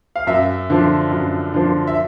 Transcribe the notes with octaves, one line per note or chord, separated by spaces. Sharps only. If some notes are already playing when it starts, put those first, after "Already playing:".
F5
F#2 E5
D3 F3
F#2
D3 F3
E5